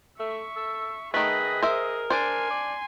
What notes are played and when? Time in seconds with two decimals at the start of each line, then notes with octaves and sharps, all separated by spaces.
0.20 A3 E5 C#6
0.56 A4
1.14 D#3 A3 G#4 B4 D#5
1.62 A#4 C5 E5
2.10 D4 C5 G#5 C6
2.51 D5